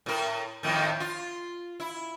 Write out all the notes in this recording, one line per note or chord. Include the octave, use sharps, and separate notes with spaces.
A2 A#4
F2 A2 D#3
F4
E4